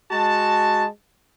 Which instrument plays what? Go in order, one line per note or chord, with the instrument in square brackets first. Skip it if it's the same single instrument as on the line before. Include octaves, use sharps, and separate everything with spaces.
[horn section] G#3 F#4 A5